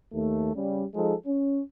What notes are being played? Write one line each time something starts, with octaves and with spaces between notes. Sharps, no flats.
D#2 A3
C#3 G3
F3 G#3 D#4 G#4 A4
C#4